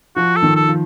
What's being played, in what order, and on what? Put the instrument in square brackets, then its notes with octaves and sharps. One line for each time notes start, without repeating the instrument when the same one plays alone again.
[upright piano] F3 [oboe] F#4
[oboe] A4
[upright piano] D#3
[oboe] A4
[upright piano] F3